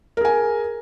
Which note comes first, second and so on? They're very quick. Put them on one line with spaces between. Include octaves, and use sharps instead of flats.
A#4 G#4 G#5